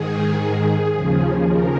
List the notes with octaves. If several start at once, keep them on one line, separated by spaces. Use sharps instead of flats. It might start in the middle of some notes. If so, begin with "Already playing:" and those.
Already playing: G#2 D#3 G#4
D#2 C#3 F3
A#4